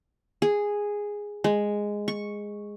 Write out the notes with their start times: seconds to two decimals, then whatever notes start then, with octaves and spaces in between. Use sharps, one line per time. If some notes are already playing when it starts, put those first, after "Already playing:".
0.42 G#4
1.44 G#3
2.08 C#6